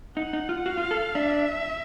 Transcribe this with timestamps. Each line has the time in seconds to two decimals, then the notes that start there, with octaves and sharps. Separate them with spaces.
0.16 D#4 F#5
0.33 D#4
0.49 F4
0.65 F#4 F5
0.78 F4
0.91 A4
1.15 D4 E5